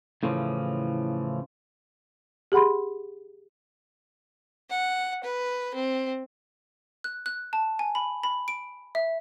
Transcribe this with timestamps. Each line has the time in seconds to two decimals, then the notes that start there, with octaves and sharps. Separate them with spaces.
0.23 A2 C#3 E3 F3
2.52 G4 G#4 F#5 B5 C6
4.70 F#5
5.23 B4
5.75 C4
7.04 F#6
7.26 F#6
7.53 A5
7.79 G#5
7.95 B5
8.23 B5
8.48 D7
8.95 E5